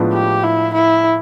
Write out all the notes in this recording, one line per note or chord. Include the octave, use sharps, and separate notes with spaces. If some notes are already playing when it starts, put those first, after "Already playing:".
Already playing: A2 F3 G#3 B3 D4
G4
E4
E4